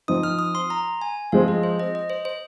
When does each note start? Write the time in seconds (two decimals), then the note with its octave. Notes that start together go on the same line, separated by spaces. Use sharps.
0.08 F3 C4 D#4 D#6
0.23 F6
0.39 D#6
0.55 C6
0.70 A#5
1.01 G#5
1.32 F3 G#3 C4 F5
1.48 D#5
1.63 C5
1.79 D#5
1.95 D#5
2.10 C5
2.25 C5